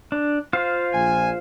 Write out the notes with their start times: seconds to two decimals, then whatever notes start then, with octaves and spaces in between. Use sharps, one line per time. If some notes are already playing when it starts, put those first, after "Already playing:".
0.12 D4
0.53 F4 C5 F5
0.94 A#1 G#5